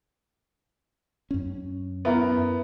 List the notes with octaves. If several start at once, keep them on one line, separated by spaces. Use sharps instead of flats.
F#2 C#4
B3 E4 A#4